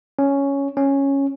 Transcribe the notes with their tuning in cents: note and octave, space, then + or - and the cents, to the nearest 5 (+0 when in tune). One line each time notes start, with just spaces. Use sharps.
C#4 +5
C#4 -5